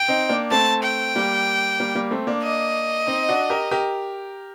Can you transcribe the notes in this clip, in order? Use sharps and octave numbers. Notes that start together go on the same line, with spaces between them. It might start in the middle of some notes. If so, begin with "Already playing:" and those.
Already playing: G5
C4 D#4
A#3 D4
A3 C4 A5
G5
G3 A#3
G3 A#3
G3 A#3
A3 C4
A#3 D4
D#5
C4 D#4
D4 F#4
G4 A#4
G4 A#4